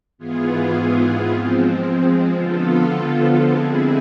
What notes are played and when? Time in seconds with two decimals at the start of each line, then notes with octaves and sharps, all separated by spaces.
0.18 G#2 E3 B3 F4 G#4
1.27 F3 G#3 C4
2.35 D3 F3 B3 F4 A4
3.45 D3 G#3 C4 E4 G#4